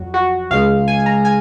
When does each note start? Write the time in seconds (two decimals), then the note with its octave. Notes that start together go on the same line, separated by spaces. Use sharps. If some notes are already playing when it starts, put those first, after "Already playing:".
Already playing: F2 F#3 F#4
0.14 F#4
0.51 C#2 C#3 G#3 F5
0.88 G#5
1.00 G#5
1.06 A#5
1.25 G#5